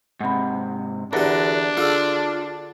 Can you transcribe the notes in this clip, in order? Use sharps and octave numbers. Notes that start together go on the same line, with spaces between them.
G#2 C3 F#5 B5
E2 D3 D4 F#4 G4 A4 A#4 F#5
D3 F4 G#4 E6